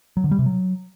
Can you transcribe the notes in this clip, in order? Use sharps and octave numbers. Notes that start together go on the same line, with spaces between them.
F#3
D3
G3
C3
F#3